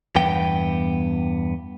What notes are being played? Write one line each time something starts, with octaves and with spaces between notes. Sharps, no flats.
E2 G2 B3 G5